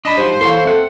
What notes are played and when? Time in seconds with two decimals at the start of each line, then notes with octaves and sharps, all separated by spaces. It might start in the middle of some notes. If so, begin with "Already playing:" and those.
0.05 D4 D#5 A5 B5
0.18 G#2 F3 F#3 G4 C5
0.41 E3 E4 A4 C#5 F5 C6
0.65 C4 A4 E5 F#5